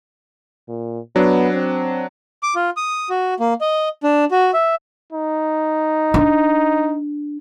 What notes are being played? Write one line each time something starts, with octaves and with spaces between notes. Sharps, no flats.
A#2
F#3 B3 D4
C4
D6
F4
D#6
F#4
A#3
D#5
D4
F#4
E5
D#4
D4